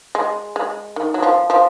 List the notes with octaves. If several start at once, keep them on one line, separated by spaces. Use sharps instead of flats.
G#3
G#3
D#3
F#3
F3
F3